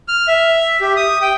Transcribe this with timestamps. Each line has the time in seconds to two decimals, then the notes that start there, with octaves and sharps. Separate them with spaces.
0.08 F6
0.28 E5
0.81 G4
0.97 D#6
1.22 G5